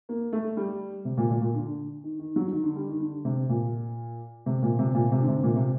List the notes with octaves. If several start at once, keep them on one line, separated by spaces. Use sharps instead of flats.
A#3
A3
G3
C3
A#2
A#2
A#2
D3
D#3
D#3
F#3
D#3
D3
G3
D#3
D3
C3
A#2
C3
A#2
C3
A#2
C3
D3
C3
A#2
C3